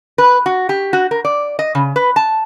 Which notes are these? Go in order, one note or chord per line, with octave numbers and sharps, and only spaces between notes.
B4
F#4
G4
F#4
A#4
D5
D#5
C#3
B4
A5